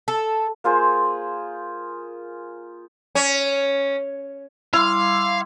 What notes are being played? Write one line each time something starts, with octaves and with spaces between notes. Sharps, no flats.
A4
A#3 F4 G#4 C5
C#4
G3 E4 F5 C6 D6